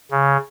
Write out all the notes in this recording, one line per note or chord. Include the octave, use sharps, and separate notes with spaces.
C#3